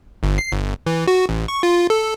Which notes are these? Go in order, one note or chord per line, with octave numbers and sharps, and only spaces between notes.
G1
C7
G1
E3
F#4
A1
C#6
F4
A4